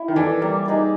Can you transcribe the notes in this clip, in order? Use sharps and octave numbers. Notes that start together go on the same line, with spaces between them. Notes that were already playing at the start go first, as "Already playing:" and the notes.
Already playing: E4
D#3
E3 A4 D5
G3 A#3
D#4 G#4 B4